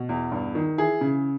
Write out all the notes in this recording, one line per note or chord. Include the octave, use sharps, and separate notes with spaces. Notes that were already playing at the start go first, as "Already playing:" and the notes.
Already playing: B2
E2
G2
D#3
E3 G#4
C#3